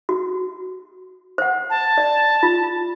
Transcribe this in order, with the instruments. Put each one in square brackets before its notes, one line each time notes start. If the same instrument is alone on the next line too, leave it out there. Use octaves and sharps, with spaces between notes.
[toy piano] F#4
C5 F#5
[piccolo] A5
[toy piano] D5
F4